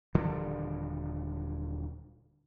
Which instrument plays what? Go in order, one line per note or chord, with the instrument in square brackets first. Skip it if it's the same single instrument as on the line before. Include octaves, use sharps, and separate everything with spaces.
[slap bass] D#1 D3 F3 G3